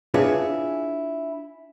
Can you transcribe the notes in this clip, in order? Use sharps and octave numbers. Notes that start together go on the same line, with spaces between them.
D4 E4 F4 G#4 B4 C#5